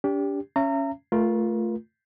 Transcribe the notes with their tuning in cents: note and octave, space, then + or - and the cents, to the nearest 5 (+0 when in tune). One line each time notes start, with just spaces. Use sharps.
D4 -40 G4 +10
C#4 +0 E5 +35 A#5 -30
A3 +0 F4 +0 A#4 +35